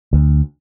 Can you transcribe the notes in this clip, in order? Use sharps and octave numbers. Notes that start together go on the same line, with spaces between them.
D2